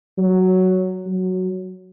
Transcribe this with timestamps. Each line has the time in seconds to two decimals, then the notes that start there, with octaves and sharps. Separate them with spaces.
0.18 F#3
1.06 F#3